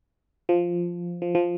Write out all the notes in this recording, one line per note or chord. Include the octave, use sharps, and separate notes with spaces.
F3
F3
F3